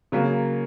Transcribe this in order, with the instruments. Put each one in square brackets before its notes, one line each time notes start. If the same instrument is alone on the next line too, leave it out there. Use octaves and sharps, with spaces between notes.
[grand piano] C#3 F#3 A#3